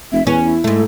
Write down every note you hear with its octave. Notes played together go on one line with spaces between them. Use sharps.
F1 E5
E2 C#4 B4
E4
G#2 A3